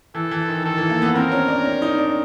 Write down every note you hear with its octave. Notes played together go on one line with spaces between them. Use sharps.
E3 A4
E3
D#3
D#3 A4
E3
A#3
B3
C4 A#4
C#4
D4
C#4
D#4
D4